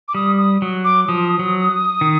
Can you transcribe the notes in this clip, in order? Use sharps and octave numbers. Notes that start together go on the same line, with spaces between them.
D6
G3 D#6
D#6
F#3
D6
F3 D#6
F#3
D#3